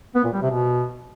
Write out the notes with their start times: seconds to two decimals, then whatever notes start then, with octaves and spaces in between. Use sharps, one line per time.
0.15 B3
0.24 A#2
0.33 G3
0.42 C3
0.51 B2